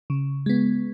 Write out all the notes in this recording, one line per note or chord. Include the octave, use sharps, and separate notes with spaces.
C#3
G#3 B3